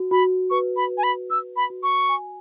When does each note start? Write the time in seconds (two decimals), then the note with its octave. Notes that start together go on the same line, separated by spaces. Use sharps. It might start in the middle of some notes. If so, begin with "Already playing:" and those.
Already playing: F#4
0.11 F#4 B5
0.50 B4 C#6
0.76 B5
0.90 B4
0.98 G#5
1.03 B5
1.30 F#4 E6
1.56 B5
1.70 F#4
1.83 C#6
2.09 G#5